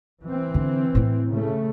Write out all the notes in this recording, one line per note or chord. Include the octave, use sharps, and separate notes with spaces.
E3 C4
D3 D4
A2 E4
C#3 A3